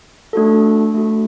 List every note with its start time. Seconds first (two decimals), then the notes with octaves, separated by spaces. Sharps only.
0.33 A3 D4 F#4 A4
0.94 A3 D4 F#4 A4